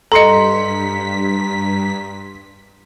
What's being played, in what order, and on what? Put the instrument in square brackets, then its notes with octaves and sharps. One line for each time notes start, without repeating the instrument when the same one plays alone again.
[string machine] G2 B6 [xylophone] A4 D#5 [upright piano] A#5 C6 C#7